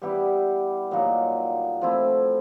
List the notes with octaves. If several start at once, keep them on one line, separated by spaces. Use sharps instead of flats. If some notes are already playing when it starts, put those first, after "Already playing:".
G3 B3 E4 G4
A#2 F#3 A#3 D#4
F3 A3 C4 E4